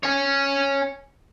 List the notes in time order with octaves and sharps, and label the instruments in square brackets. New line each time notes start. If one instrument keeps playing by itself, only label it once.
[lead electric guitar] C#5 G#5